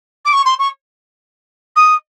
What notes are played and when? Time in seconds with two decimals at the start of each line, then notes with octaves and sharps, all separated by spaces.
0.25 D6
0.32 C#6
0.45 C6
0.58 C#6
1.76 D#6